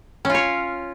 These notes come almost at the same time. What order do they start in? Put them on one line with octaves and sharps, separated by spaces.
C#4 F4 C#5